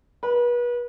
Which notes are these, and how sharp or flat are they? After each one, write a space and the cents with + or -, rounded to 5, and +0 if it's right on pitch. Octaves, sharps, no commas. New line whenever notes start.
B4 -35